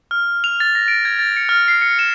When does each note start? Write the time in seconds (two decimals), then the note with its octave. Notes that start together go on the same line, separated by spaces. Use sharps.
0.11 F6
0.44 F7
0.60 A6
0.75 A#6
0.88 D7
1.05 G#6
1.19 A6
1.37 C#7
1.49 F6
1.68 C7
1.82 C#7
1.99 E7